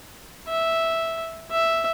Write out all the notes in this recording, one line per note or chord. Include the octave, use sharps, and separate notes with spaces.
E5
E5